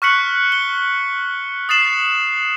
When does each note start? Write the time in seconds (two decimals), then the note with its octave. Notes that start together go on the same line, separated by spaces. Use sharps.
0.02 C#6 F6 F#6 B6 C#7 F#7
0.52 G7
1.69 D#6 A6 C7 E7 F#7